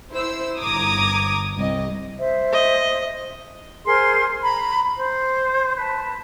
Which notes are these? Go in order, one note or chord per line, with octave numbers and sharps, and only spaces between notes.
E4 C5 E6
G1 G2 A#5 D6 D#6 G#6
C2 D#5
C5 E5
D#5
G#4 A#4 C5 C6
A#5 B5
C5
B4 A5